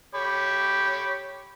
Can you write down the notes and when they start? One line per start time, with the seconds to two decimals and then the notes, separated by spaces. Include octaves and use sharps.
0.15 G4 C#5 B5